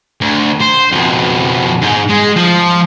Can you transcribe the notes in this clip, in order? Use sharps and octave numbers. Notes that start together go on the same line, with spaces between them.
D2
C5
F2 B2
G#2 D#4
G#3
F3